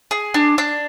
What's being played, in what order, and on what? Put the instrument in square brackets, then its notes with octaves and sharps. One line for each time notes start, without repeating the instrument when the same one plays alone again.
[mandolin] G#4
D4
D4